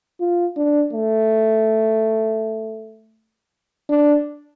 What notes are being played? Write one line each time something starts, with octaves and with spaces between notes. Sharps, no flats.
F4
D4
A3
D4